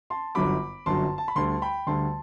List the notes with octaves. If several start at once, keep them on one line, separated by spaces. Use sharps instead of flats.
A5 C6
G1 F#2 D3 F#3 B5 D6
G1 F#2 D3 F#3 A5 C6
A5
B5
D2 D3 G3 A5 C6
G5 B5
D2 D3 G3 A5 C6